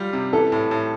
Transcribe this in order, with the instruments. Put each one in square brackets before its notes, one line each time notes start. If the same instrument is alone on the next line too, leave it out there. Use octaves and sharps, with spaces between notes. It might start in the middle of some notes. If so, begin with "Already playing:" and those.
Already playing: [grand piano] G3 F4
C3
[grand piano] E3 [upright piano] A4
[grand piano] A2
A2